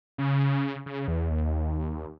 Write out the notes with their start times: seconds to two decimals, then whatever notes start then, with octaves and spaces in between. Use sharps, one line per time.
0.18 C#3
0.86 C#3
1.08 E2
1.30 D#2